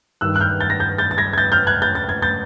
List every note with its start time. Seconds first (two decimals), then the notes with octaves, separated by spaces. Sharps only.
0.21 G2 D#3 E6 F#6
0.36 F#6
0.40 F6 G6
0.60 G6 A6
0.70 A#6
0.80 G6 A6
0.98 G6 A6
1.11 A6
1.18 G#6 A#6
1.33 G#6
1.38 G6 A6
1.52 F6 G6
1.67 F#6 G#6
1.82 G6 A6
1.95 A6
2.09 G#6
2.22 G6 A6